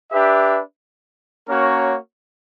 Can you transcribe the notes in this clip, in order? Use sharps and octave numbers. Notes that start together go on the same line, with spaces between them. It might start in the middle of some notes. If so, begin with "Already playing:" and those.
D4 G4 B4 E5
A#3 C#4 F#4 A#4 C#5